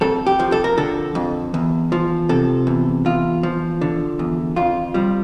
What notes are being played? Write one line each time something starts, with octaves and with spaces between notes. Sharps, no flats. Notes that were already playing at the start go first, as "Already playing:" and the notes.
F2 A4
G4
F3
A4
A#4
D3 A4
F2
E2
F3
C3 A4
E2
E2 F4
F3
D3
E2
F2 F4
F3 G3